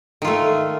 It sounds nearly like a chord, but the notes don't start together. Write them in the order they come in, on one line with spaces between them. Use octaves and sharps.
D#3 F4 A3